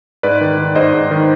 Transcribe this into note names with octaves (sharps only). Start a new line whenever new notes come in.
G#2 B4 D5
D#3
D#3
G#2 C5 D#5
G#2
D#3